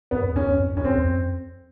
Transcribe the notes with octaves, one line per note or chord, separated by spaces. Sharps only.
F2 B3
F2
E2 C#4
F2
F2
F2 C#4
E2 C4
F2